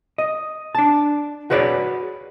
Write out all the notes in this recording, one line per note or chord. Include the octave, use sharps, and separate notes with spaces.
D#5
D4 A5
F#4 G#4 B4 C#5 D5